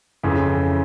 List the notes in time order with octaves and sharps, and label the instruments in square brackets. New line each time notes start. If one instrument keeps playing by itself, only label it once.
[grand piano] F2 C#3 E3